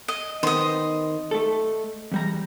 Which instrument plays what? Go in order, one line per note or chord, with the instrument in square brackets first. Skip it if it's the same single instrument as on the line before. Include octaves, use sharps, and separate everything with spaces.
[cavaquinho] D#5
[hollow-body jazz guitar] D#3 B3 C4 [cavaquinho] D#5 C6
[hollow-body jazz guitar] A3 A4
E2 G3 A#5